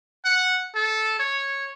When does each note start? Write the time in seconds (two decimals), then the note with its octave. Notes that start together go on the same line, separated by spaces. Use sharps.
0.25 F#5
0.75 A4
1.19 C#5